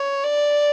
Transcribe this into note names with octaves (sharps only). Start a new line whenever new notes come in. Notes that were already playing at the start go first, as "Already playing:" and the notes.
Already playing: C#5
D5